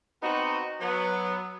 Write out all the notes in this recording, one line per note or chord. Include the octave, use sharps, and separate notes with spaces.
B3 C4 D#4 F#4
F#3 B3